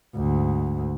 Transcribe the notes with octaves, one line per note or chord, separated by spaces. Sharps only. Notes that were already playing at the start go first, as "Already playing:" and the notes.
D2 G#2